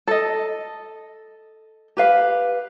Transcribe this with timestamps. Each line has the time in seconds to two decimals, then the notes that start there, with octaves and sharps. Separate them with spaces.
0.07 A4 D#5
1.97 G4 B4 F5